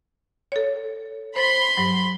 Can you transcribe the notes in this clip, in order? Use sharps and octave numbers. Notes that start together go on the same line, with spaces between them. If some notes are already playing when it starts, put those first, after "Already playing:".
A4 C#5
C5 B5 C6 A6
G2 F#3